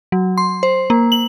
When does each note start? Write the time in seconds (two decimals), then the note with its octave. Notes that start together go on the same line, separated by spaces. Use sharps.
0.12 F#3
0.38 C6
0.63 C5
0.90 A#3
1.12 F#7